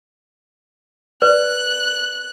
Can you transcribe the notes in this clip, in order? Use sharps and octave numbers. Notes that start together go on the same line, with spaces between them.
B4 D5 F#6